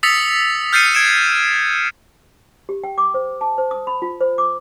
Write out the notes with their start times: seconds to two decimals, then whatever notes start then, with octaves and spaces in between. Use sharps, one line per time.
0.03 D#6 E6 A6 B6 C#7 F7
0.73 F6 G6 A6 C7 C#7 D#7
0.95 G#6 D7 E7
2.69 G4
2.84 G5
2.98 D6
3.14 C5
3.41 A5
3.58 C5
3.71 D#6
3.87 B5
4.02 F4
4.21 C5
4.38 D6